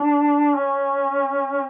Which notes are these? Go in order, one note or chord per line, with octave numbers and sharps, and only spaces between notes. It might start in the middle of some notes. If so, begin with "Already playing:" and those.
Already playing: D4
C#4